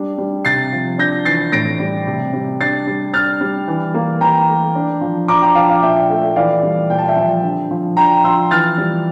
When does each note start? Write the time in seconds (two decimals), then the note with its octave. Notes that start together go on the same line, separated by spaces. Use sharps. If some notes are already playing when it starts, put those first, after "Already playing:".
Already playing: G3 D4
0.18 G3
0.45 C3 A6 C7
0.72 F3
0.98 D4 G6 A#6
1.25 E3 A6 C7
1.52 A2 A#6 D7
1.80 G3
2.07 C3
2.33 G3
2.61 D4 A6 C7
2.87 G3
3.14 D4 F6 A6
3.41 G3
3.68 E3
3.94 A#3
4.21 E3 G5 A#5
4.48 A3
4.75 D4
5.01 F3
5.28 D4 A#5 D6
5.42 G5 A#5
5.55 F3 F5 A5
5.68 F5 A5
5.82 A#2 E5 G5
6.10 A3 E5
6.36 E3 D5 F5
6.63 G3
6.90 A#2 G5
6.98 A5
7.08 E5 G5
7.17 F3
7.43 D3
7.71 F3
7.97 D4 G5 A#5
8.24 F3 C6 E6
8.51 E3 F6 A6
8.78 G3